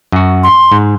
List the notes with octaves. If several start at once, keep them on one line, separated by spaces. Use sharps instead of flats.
F#2 F#4
C6
G#2